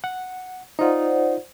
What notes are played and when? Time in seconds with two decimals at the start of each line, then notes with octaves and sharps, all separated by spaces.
0.04 F#5
0.79 D#4 F4 C5 D5 F#5